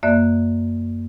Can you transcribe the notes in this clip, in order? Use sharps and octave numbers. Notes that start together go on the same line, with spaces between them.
F#2 A#3 D5 E5 F#6